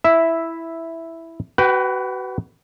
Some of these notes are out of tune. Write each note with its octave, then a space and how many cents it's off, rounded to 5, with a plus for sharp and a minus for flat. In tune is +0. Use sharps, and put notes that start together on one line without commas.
E4 +0 E5 +0
F#4 +30 B4 +10 G5 -10